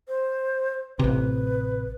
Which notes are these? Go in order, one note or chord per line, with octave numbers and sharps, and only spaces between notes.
C5
A1 C3 B4